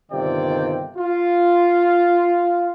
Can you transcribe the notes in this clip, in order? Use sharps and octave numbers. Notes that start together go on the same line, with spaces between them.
G1 C3 D#3 F4 D5 G5
F4